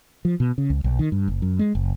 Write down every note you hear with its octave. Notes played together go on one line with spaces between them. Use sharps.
F3
B2
C#3
C#2
B1
D#3
G2
F#1
F#2
G#3
F#1